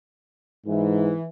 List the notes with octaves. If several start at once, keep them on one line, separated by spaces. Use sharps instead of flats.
G#2 E3